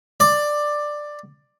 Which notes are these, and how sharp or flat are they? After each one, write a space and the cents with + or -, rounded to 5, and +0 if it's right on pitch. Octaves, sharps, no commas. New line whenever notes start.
D5 +10